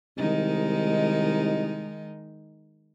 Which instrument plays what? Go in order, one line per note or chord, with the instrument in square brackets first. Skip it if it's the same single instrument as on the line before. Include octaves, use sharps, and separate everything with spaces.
[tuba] C2 [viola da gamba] D#3 G#3 D#4